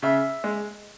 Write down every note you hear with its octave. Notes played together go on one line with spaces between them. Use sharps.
C#3 E5
G#3